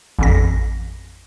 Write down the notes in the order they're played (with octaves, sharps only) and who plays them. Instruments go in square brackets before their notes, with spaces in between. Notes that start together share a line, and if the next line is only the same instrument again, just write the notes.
[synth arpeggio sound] A1 F2 A#6